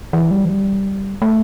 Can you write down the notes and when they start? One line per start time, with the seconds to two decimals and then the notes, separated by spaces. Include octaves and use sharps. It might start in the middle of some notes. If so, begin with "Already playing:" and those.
0.13 E3
0.31 G3
0.45 E3
0.49 G3
1.22 A3